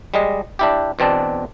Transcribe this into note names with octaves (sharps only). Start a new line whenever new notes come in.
G3 G#3 D#5
D4 E4 G4
E2 B2 C4 D4 A5